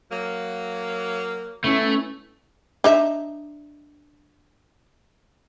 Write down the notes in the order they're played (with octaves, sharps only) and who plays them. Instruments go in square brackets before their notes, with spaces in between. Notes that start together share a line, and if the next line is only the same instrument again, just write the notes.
[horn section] F#3 A#3
[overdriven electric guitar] A3 [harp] B3 C#4 E4
[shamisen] D4 D#4 E5